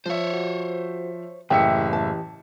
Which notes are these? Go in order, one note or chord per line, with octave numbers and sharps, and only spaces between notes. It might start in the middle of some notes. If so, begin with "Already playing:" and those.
F3 C5 C#5 E5
F#4
F#1 A2 E3 G4 D#5 E5 G5 C#7
A5